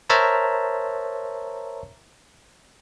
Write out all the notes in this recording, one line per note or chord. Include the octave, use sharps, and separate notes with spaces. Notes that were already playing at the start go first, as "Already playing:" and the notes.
A#4 C5 C#5 E5 A5 A#5